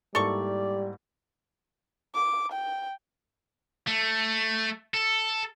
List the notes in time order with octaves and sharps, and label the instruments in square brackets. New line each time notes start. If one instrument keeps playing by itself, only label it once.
[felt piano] G#2 A#3 E4 [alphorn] G3 [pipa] A4 C#6 [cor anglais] D5
[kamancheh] D6
G5
[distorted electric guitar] A3
A4